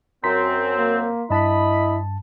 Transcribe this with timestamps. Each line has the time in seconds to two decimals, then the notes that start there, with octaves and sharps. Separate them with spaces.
0.24 F#2 C4 A#5 C6 B6
0.77 A#3
1.30 G2 E4 D#5 A5 B5